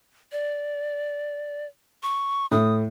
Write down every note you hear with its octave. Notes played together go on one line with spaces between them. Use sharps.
D5
C#6
A2 D#6